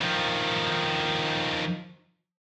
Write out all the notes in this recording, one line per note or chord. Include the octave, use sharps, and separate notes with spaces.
D#3 F3